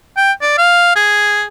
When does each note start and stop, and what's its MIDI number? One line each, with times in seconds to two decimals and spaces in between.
0.17 0.32 79
0.42 0.56 74
0.58 0.96 77
0.96 1.44 68